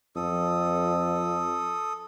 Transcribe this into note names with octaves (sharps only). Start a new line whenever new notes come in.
F2 A4 D#6